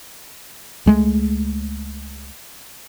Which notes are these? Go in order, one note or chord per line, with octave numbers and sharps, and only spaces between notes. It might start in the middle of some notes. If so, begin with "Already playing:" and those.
C#2 G#3 A3